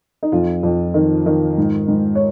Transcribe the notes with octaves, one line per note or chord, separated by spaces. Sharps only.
D#4
F2 F4
F2
D#3
D#3
G#2
G#2
C#5